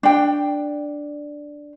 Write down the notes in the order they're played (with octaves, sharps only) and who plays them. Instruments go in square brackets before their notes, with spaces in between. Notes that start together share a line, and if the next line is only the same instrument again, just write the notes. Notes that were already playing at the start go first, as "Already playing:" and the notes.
[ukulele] D4 G5